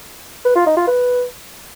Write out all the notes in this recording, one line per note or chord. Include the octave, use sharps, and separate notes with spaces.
B4
F4
D#4
F4
B4